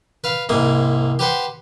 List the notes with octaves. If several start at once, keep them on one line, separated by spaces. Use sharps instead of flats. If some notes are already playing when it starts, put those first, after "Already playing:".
B4 F5
C2 G#2 A#3 D#6
G4 B4 C5 F#5